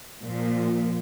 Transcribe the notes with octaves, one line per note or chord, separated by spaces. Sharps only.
A#2 F3